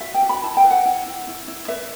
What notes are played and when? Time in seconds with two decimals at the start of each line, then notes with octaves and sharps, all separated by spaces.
0.01 F#4 E5
0.14 G5
0.23 F#4
0.29 B5
0.43 E4 A5
0.57 G5
0.64 B4
0.71 F#5
0.85 E4
1.06 E4
1.27 E4
1.48 E4
1.68 B4 E5